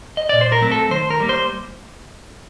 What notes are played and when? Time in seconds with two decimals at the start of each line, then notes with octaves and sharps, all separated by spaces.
0.17 D#5
0.29 A#2 D5
0.41 C5
0.52 A#4
0.61 F#3 A3 C4
0.72 A4
0.91 D#3 C5
1.10 A#4
1.20 G3 A#3
1.29 C5